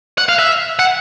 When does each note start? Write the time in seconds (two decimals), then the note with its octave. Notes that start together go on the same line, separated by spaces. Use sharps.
0.18 F#5
0.29 F5
0.39 E5
0.79 F#5